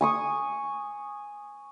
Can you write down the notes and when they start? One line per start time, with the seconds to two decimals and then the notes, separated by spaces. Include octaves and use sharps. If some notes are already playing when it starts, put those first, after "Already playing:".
0.01 G#5 C#6 D#6